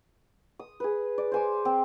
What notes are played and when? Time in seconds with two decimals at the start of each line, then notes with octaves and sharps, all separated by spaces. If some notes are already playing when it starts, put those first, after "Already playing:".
0.59 D#6
0.80 G#4 B4
1.18 D5
1.32 C5 G#5 D6
1.65 C4